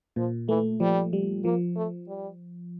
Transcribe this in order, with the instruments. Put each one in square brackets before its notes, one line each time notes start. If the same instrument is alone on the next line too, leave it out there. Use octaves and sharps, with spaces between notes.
[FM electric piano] A#2 [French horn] F3
[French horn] E3 [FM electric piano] A3
[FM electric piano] F3 [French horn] G3
[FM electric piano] G3
[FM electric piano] F3 [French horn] A#3
[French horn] A3
G3